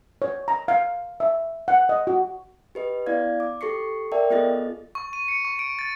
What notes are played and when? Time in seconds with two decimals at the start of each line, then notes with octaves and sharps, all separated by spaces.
0.22 C#5
0.48 A#5
0.68 F5
1.20 E5
1.68 F#5
1.89 D#5
2.07 F#4
2.75 G4 B4 D#5
3.06 B3 E4 D5 F5 G#6
3.40 D6
3.61 G4 A4 C#6 C7 C#7
4.12 A#4 D5 E5 G5 A5
4.30 B3 F4 G#4 A4 D#5 A6
4.95 C#6
5.13 D#7
5.28 C#7
5.45 C#6
5.59 D7
5.79 A6